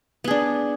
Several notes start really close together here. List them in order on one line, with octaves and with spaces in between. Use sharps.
B3 G#4 D4